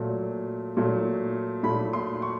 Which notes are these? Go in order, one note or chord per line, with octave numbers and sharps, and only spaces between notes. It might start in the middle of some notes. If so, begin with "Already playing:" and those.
Already playing: A#2 F#3 A3
A#2 F#3 A3
A#2 F#3 A3 B5
C6
C#6